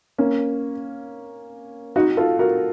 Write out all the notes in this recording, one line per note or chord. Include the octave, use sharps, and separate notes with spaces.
A#3 C#4
D#4 F#4
F4 A4
F#4 A#4